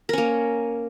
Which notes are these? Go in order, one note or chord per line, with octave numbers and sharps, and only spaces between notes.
A#3 C#4 A#4